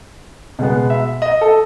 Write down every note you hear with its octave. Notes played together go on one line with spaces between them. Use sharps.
B2 G#3 B3
E5
D#5
A4